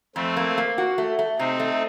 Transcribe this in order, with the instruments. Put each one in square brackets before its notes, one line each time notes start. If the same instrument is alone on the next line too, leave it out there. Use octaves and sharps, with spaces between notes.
[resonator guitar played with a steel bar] F2 [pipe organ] A3 C4
[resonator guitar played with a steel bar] A#3
A#3
F#4
A3
A3
[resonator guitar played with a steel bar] C3 [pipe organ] C4 D#4
[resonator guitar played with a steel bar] A3